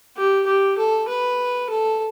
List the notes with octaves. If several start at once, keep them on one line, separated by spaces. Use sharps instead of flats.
G4
G4
A4
B4
A4